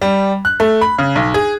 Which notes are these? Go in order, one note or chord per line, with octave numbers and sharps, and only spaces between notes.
G3
F#6
A3
B5
C#3
B1
G#4